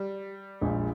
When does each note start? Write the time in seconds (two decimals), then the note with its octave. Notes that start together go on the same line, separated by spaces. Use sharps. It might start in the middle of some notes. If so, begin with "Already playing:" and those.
Already playing: G3
0.61 A#1 A#2 G#3